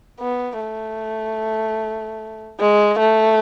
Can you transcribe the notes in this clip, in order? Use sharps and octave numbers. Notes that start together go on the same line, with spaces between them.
B3
A3
G#3
A3